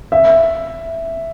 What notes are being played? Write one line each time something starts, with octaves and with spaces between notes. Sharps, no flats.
E5